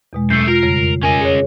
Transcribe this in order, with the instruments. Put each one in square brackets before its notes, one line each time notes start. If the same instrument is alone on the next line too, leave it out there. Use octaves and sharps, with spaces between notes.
[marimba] E2 B2 G#3
[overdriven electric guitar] F#2 A3 [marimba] G6 [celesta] C7
[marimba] F4 [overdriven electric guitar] A#4
[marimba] F2 C#3 G3
[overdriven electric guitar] C#4 D#5 [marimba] A#4 [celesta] G#5
[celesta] G#4 C#5